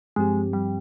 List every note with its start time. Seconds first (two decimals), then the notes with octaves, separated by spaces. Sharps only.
0.16 G2 F3 G#3 C4 G4
0.53 G3